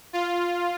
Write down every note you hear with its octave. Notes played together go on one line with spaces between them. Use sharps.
F4